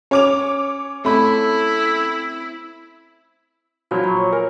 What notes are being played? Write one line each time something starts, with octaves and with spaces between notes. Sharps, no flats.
C#4 C#5 D6 F7
A3 C4 E4 B5
A#2 F3 F#3 B5
A#5 C#6
C#5
A#4 C#5 G#5